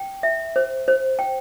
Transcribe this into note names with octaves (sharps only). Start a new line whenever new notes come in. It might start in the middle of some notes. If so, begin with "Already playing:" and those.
Already playing: G5
E5
C5
C5
G5